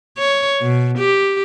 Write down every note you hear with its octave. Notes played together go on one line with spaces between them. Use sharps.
C#5
B2
G4